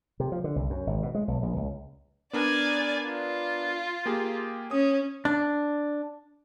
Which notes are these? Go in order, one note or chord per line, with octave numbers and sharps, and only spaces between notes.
C3
F3
D3
C2
F#2
G#1
B2
G#3
B1
A#1
C#2
B3 D4 A#4 D5 G#5
F4
A#3 G4 G#4
C#4 D#6
D4